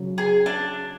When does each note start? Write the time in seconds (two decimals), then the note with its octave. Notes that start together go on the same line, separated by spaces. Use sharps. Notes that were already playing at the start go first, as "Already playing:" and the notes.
Already playing: C#3 F#3
0.18 G#4
0.46 D4